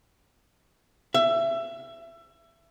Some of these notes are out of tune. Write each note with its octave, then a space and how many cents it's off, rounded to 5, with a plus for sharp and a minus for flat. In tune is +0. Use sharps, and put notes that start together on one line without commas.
E5 +25